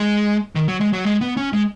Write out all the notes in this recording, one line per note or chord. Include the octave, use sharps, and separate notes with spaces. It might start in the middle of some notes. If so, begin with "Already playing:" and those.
Already playing: G#3
D#3
F#3
G#3
F#3
G#3
B3
C#4
G#3